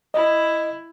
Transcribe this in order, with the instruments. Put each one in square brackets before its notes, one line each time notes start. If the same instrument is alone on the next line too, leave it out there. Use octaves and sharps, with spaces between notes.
[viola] E4 [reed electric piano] D#5